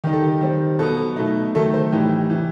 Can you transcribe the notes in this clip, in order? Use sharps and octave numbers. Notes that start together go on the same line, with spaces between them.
D#3 G3 D#4 G4
A4
G4
D#3 G3 C4
B2 F#3 B3 A4
B2 A3 D#4
D#3 F#3 A3 A4
C5
A2 E3 G3 D#4 G4
C3 E3